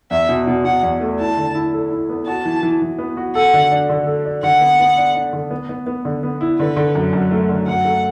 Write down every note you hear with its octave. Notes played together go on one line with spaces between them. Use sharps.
E2 E5
B2
B2
B2 F#5
E2
A3
E4 A5
D3
E4
A4
E4
B3
F#4 A5
E3
E3
E3
B3
F#4
A4 F#5
D3
D4
D3
A4
D4
D3 F#5
B3
B3
D4
D4
D3
B3
B3
B3
D3
B3
E4
D3 B4
D3
F#2
F#2
A3
D3
F#2 F#5
A3